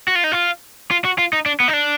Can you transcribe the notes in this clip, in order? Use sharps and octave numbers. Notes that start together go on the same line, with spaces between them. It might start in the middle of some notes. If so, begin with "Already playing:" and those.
F#4
F4
D#4
F4
F4
F#4
F4
D#4
D4
B3
D#4
D4